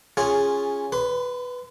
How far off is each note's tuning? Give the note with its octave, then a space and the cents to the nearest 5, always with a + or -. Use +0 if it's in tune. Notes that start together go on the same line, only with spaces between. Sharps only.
C#4 +0 F4 +0 G#4 -10
B4 +0 C6 -35